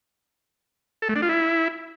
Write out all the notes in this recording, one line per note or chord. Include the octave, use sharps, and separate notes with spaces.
A4
A3
D4
F4
E4